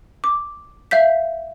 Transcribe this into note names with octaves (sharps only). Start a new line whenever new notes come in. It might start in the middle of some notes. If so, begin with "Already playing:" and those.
D6
E5 F5 G6 B6